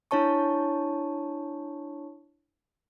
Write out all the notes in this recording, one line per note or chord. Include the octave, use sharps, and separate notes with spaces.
D4 E4 C#5 A5 C#6